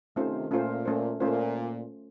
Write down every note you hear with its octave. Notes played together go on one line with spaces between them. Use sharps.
C3 D#3 A3 C#4 F4 C5
A#2 A3 C#4 F4 C5
A3 C#4 F4 C5
A#2 A3 C#4 F4 C5